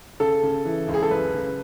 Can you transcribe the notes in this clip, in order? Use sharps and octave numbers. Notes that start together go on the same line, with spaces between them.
C#3 A4
C#3
E3
C#2
G#4
A4
F#2 B4
C#3